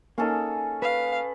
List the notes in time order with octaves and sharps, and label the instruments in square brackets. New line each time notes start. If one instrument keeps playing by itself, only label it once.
[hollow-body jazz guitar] A#3 D#4 [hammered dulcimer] C#4 G#4 A4
[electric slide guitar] B4 [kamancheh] F5